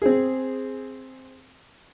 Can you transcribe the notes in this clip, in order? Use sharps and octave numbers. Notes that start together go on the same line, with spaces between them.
C4 G#4